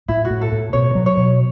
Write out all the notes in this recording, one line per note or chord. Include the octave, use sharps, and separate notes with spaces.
A2 E4
F#4
A2
A4
A2
B2 C#5
F#3
C#5
B2